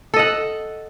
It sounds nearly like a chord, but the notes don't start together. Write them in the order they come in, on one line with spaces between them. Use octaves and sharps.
A4 D#5 F#5